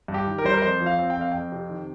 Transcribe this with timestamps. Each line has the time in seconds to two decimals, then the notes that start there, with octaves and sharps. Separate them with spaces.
0.08 G2
0.14 G4
0.27 D#3
0.38 A#4
0.44 G3 C5
0.53 A#4
0.62 F2 C5
0.81 F3
0.86 F5
0.99 C4
1.10 G5
1.16 F2
1.21 F5
1.32 F2 G5
1.52 C3
1.70 D#3